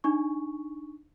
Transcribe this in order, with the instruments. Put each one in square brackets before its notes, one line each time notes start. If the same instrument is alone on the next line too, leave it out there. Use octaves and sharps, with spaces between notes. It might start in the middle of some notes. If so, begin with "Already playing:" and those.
[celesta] D4 D#4 C#6